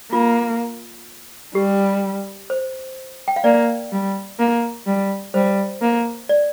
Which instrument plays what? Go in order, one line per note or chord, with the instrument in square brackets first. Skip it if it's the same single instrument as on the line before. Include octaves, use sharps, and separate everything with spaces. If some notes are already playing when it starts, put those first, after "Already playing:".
[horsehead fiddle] A#3 [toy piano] F4
[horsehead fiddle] G3 [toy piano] G4
[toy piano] C5
G5
F5
[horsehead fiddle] A#3 [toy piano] D5
[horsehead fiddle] G3
A#3
G3
[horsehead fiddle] G3 [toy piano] C5
[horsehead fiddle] A#3
[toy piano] D5